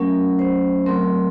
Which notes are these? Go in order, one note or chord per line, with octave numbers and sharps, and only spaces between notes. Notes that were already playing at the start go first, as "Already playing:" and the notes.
Already playing: F#3 A3 C#4 A#4
C5
F#3 A3 C4 A#4